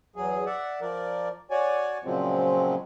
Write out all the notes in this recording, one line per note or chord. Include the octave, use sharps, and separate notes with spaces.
E2 F#3 G#4
D5 E5 F#5
F3 A#4 D5
F#4 C#5 D5 G#5
A#2 C#3 F3 F#3 G#3 C4